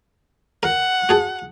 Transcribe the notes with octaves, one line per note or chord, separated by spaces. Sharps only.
A#4 F#5
F#4 G#4 A4